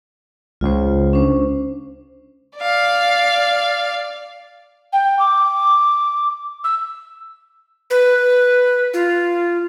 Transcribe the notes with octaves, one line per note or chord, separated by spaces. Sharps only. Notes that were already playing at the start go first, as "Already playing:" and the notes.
C#2 F4 C5
C#4 D4 C5
D5 F5
G5
D6
E6
B4
F4